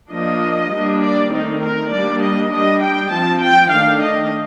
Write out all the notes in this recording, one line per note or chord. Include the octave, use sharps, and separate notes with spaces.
F3 A#3 D4 D#5
G3 A#3 D4
D5
D#3 A3 C4 D#4
A#4
G3 A#3 D4 D5
D#5
G3 D4 D#5
G5
F3 C4 A5
G5
D#3 A3 D4 F5
D#5